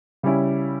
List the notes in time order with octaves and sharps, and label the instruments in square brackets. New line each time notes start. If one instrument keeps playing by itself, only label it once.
[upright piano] C#3 G3 C#4 E4